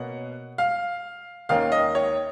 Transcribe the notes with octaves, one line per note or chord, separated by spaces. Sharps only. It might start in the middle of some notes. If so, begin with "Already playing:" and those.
Already playing: B2 A#3 C#4 F#5
F5
D#2 D#3 A#3 C#4 F5
D#5
C#5